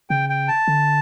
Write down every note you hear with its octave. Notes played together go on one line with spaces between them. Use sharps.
C#3 G5
G5
A5
D3